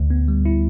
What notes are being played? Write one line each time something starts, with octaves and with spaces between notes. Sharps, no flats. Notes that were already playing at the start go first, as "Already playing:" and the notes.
Already playing: D2
B3
G3
E4